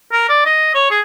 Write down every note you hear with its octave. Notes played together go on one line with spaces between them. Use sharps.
A#4
D5
D#5
C#5
G#4